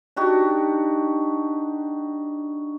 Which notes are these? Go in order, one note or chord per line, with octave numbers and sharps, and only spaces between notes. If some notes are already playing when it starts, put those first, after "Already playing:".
D4 D#4 F#4 G4